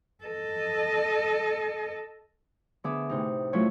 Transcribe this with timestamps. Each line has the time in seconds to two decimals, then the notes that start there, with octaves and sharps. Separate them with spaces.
0.25 A4 D#5
2.84 D3 B3 G#4 E5 D6 D#6
3.09 A2 C3 D#4
3.53 F#3 A3 C#4 E4 F4 C#5